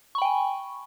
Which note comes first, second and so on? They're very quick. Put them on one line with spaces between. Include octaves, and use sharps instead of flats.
C#6 B5 G5 G#5